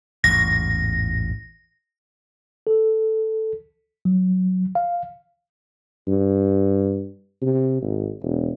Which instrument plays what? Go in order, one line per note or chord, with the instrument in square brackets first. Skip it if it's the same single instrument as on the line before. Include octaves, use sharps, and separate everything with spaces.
[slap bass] A1 E2 G#2 [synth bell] A#6
[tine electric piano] A4
F#3
F5
[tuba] G2
C3
G#1
E1